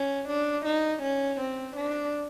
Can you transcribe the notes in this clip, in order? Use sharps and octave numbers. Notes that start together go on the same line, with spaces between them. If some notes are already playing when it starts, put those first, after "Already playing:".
Already playing: C#4
D4
D#4
C#4
C4
D4